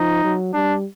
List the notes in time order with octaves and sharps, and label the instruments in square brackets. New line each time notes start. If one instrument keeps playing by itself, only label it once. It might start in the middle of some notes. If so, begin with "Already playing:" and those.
Already playing: [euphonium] F3 [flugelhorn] D#4
[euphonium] F#3
[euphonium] G3 [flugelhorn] D4